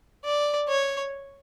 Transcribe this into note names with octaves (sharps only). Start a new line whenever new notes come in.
D5
C#5